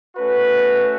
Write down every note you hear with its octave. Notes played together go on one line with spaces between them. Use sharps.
A3 C#4 F#4 B4